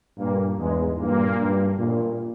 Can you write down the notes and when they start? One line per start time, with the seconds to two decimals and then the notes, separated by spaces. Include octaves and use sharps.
0.17 G2 A#2 A#3
0.57 E2 G#2 G#3
0.98 G2 A#2 A#3
1.38 G2
1.78 A#2